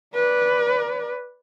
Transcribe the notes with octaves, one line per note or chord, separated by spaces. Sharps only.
B4 D5